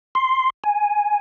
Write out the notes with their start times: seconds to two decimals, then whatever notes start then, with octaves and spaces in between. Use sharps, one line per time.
0.15 C6
0.64 G#5